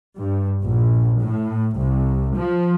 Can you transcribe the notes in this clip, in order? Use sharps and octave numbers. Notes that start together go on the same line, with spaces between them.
G2
A#1
A2
C2
F3